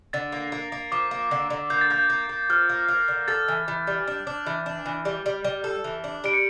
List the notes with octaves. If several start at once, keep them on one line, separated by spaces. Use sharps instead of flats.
D3 A6
A#3
A#3
A#3
F3 D6
A#3
D3
D3
A#3 G6
A6
A#3 G6
A#3
A#3
F3 F6
A#3
A#3
D3
A4 A6
E3
E3
G3
D4
D4
E3
D4
E3
G3
G3
G3
A4
E3
D4
G3 D7
C#7